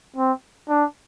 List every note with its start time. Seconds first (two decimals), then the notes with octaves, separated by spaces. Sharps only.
0.16 C4
0.69 D4